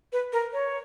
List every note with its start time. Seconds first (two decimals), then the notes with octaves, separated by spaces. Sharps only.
0.13 B4
0.33 A#4
0.53 C#5